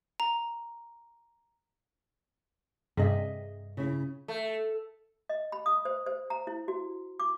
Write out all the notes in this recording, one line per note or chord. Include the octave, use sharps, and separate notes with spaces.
A#5
G2 C3 G#4 D#5 E5
C#3 E4
A3
D#5
B5
D#6
C5
C5
A#5
E4
F#4
D6